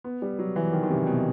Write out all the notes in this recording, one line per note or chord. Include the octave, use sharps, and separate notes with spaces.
B3
G3
F#3
E3
D#3
D#3
C3
B2